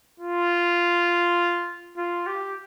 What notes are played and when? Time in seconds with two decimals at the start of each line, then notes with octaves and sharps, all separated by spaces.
0.20 F4
1.97 F4
2.27 G4